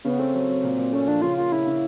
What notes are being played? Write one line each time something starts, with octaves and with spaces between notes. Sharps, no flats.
C#3 B3
A3 C4
F#3
F#3
A#2
A#2
A3 C#4
F3 D4
C#3 F4
A#3 F4
C#3 E4
C#3